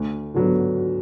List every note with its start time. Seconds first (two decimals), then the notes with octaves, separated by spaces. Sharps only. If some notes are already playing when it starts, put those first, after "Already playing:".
Already playing: D2
0.34 D3 F#3 B3